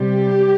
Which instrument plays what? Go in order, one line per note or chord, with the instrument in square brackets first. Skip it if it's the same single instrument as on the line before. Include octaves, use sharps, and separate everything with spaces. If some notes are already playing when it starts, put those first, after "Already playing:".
Already playing: [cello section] C3 G3 G4